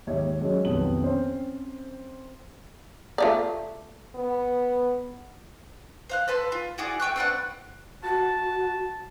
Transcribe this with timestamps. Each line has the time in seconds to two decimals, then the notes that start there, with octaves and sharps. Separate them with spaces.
0.07 D#2 G#2 C#5 E5 G#6
0.40 F#3 G#3 C#4
0.65 B1 F2 C3 D#3 B3 F#7
1.02 C4 C#4 C5
3.18 A3 F4 D5
4.15 B3
6.09 C5 F5 F#6
6.28 A4 B4 C6
6.52 F4
6.78 E4 F#4 G#4 D5
7.00 A3 G5 C#6 F#6
7.16 C4 D4 B4 F#5
8.03 F#4 A5